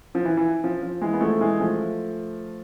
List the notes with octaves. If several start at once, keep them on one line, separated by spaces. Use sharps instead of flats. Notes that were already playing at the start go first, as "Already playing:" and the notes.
F3
E3
E3
F3
F3
E3 G#3
B3
F3 A3
E3 G#3
F3 A3